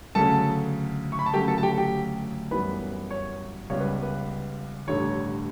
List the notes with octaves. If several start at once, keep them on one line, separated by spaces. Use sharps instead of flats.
D2 C#3 F#3 A4 A5
C#6
B5
A5
D2 C#3 F#3 A3 G4 G5
A4 A5
A5
G4 G5
G4 G5
F#2 E3 G3 B3 B4 B5
C#5
C#2 C#3 G3 B3 C#5
B4
B4
A1 G2 D3 A3 C#5